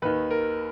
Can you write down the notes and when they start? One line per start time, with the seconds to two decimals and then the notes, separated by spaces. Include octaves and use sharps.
0.02 D#2 D#3 B4
0.31 A#4